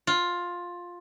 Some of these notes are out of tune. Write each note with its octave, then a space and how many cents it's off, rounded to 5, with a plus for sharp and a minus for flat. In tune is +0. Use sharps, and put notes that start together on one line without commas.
F4 +10